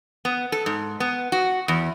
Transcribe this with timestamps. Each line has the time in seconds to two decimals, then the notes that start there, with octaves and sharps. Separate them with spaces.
0.25 B3
0.52 A4
0.66 G#2
1.00 B3
1.32 F#4
1.68 E2